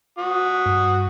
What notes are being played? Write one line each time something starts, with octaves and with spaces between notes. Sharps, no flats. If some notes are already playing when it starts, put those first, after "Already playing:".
F#4 D#6
G2